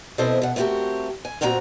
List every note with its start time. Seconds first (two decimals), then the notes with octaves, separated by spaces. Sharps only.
0.18 B2 C4 E4 A4 C5 D#5
0.42 B2 F#5
0.56 A3 B3 C4 F#4 G4 A#4
1.25 G#5
1.41 F2 A#2 C4 F#4 G#4 A#5